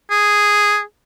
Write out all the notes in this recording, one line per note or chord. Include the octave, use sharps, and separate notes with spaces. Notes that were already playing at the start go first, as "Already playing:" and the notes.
G#4